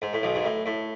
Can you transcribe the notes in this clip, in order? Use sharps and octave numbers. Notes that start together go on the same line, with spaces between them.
G#2
A2
B1 B2
G#2
A2
A2